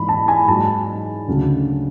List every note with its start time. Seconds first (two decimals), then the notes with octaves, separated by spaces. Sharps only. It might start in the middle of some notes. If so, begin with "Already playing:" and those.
Already playing: G#2 E3 B5
0.09 A5
0.28 G#5
0.48 G#2 F#3 A5
1.28 D2 C#3 F#3